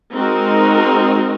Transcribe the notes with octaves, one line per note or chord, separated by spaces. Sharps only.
G#3 C4 D#4 F#4 A#4